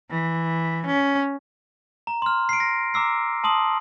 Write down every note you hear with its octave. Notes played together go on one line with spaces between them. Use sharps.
E3
C#4
A#5
C6 F6
C7 D7
A#6
A#5 D6 E6 C7
A5 C6 D#6 F#7